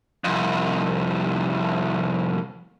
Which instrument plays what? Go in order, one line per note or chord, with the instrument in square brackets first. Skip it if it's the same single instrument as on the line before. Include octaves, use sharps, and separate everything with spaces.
[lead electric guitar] C2 F2